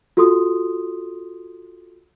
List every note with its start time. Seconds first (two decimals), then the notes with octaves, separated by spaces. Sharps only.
0.17 F4 F#4 A4 C6 D#6